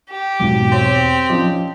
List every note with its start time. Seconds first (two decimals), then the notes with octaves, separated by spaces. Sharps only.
0.11 G4
0.40 G#1 E2 B2 F#3 D6
0.72 C4 C#5
1.30 F3 C#4 D#5